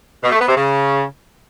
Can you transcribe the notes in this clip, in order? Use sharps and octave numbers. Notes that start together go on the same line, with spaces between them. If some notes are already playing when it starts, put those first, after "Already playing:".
B2
A3
B3
C3
C#3